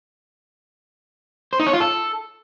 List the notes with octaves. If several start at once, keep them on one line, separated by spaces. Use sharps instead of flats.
C5
D#4
C#5
F4
A4